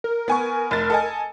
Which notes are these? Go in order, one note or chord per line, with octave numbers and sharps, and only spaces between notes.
A#4
B3 G#5 C#6
F1 A6
A4 D#5 G#5